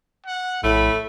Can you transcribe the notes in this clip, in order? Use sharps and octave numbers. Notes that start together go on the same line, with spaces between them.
F#5
A#1 A2 A3 B5